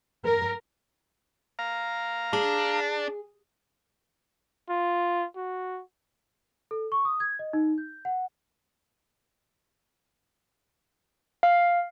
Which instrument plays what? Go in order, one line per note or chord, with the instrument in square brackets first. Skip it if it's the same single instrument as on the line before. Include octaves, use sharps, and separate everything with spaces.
[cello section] A#4
[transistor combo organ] F5 A#5
[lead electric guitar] D4 [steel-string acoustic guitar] G#4
[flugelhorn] F4
F#4
[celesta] A4
C#6
D#6
G#6
D#5
D#4
G6
F#5
[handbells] F5